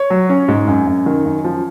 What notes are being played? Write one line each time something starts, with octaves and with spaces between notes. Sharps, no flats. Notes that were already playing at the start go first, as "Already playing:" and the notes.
Already playing: C#5
F#3
C#4
G#2
F#2
F#2
D#3
F#2
F3